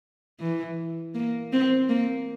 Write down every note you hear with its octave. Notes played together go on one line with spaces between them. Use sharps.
E3
A#3
C4
A#3